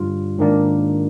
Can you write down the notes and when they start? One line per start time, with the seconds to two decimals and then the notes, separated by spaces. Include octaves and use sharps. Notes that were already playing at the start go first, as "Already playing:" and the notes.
Already playing: G2 D3 G3 D4 F4
0.38 G#2 D#3 A#3 D4